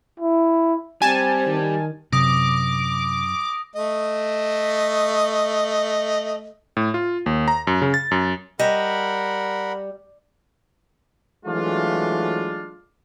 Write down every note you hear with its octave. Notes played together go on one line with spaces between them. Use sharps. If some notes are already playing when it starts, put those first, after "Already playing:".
E4
G3 C4 G4 G#5 A5
D#3
F#2 C3 D6 D#6 A#6
A3 D#5
A2
F4
D#2
A#5
F#2
C#3
A6
F#2
G3 A#4 D#5 F#5 B5
E3 F#3 G#3 A3 D4 F4